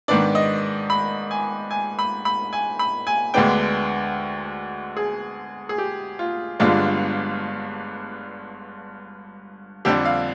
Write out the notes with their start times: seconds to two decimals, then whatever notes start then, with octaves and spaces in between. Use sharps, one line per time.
0.08 G#2 D#3 B3 D4 D5
0.35 D#5
0.90 B5
1.31 G#5
1.71 G#5
1.99 B5
2.25 B5
2.53 G#5
2.79 B5
3.07 G#5
3.34 D2 D3 G#3 B3 D4 G5
4.97 G#4
5.69 G#4
5.78 G4
6.19 F4
6.59 G1 G2 D3 G#3 D4 F4
9.85 F2 D3 G3 D4 G4
10.05 F5